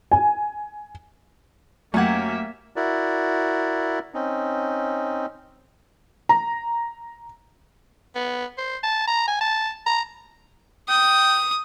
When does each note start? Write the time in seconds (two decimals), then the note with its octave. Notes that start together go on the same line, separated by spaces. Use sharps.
0.12 G#5
1.94 F#2 A3 A#3 C#4 G4 E5 F#5 G#6
2.76 E4 F#4 A#4 D5
4.14 C4 C#4 D#4
6.29 A#5
8.15 B3
8.58 C5
8.83 A5
9.07 A#5
9.27 G#5
9.41 A5
9.86 A#5
10.89 G5 D#6